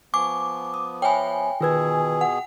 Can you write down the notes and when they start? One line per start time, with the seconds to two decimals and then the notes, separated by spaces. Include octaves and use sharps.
0.14 F3 B3 G#5 C#6 D6
0.74 D#6
1.02 C#5 E5 G5 G#5 B5
1.61 B2 D#3 F4 G#4 B4 E6 G#6
2.21 F#5